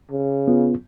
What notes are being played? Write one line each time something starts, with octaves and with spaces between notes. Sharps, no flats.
C#3
B3 F4